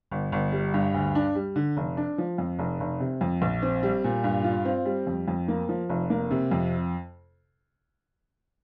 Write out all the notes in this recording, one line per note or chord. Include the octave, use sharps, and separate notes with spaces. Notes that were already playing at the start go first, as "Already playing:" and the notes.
G1
G1
G3
G2
D2
D4
G3
D3
F1
D4
F3
F2
F1
F1
C3
F2
A#1
C4
G3
A#2
G2
F4
C4
G3
F2
F2
A#3
F3
F1
A#3
C3
F2